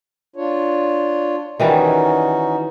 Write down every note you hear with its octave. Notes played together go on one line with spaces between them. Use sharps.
D4 F4 C#5
D#3 E3 G3 C#4 D#4 F#4